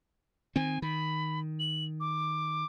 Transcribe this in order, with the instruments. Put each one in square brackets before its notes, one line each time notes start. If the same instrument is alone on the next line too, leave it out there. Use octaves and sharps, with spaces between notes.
[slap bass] D#3 C4 [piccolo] G#5
[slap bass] D#3 [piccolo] B5
[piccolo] F#7
D6